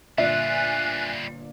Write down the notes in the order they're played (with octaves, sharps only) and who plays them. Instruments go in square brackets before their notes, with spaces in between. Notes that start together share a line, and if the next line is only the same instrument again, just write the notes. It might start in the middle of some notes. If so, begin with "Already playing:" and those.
[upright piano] G1 A#2 D5 [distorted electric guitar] G3 F4 [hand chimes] E5 [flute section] G#5 F#6